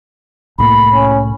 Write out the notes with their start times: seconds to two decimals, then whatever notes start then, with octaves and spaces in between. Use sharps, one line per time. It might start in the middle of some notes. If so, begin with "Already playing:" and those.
0.58 C2 A2 A#3 B5
0.93 C#4